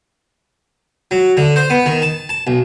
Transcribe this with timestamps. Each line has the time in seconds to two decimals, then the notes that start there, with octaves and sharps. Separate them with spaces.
1.11 F#3
1.37 D3
1.56 C5
1.70 B3
1.86 D#3
2.02 A5
2.29 A5
2.47 B1